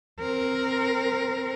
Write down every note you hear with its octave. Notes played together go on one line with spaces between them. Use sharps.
C4 A#4